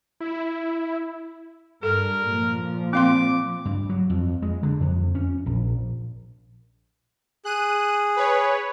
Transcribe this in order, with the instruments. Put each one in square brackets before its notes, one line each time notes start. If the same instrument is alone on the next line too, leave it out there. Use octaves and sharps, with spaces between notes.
[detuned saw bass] E4
[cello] G2 [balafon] A4 [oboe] A#4
[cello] A#2 F3
[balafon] C4 F5 C6 [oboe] D6
[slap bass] G2
F#3
F2
G#3
D3
F2
C#4
A#1
[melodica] G#4 [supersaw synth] F#6 D#7
[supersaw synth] B4 C#5